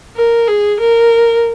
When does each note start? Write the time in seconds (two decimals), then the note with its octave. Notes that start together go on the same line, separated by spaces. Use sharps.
0.16 A#4
0.47 G#4
0.80 A#4